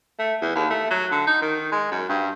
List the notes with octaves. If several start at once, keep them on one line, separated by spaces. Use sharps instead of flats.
A3
E2
D#2
A3
F#3
D3
D#4
D#3
G#3
F#2
G2